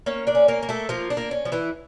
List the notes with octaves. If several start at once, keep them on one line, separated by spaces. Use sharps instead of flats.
A#3 C#4 C#5
D4 D5
C#4
A#3 A#4
A#3
A3 A4
F3 A#3 F4
D4
A#3
C#4
F3
E3 E4